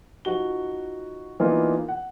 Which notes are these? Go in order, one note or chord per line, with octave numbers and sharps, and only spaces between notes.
F3 D#4 F#4 G7
E3 A#3 B3 D4 D#4 F4
F#5